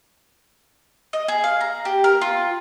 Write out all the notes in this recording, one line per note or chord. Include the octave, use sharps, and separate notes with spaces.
D#5
G#4
F5
A#5
G4
A#4
F4